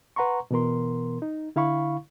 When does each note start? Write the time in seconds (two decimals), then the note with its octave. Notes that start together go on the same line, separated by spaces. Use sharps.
0.16 B4 F#5 A#5 C6 C#6
0.51 B2 E3 B3 A#4 C6
1.22 D#4
1.56 D3 E4 F5 B5 C#6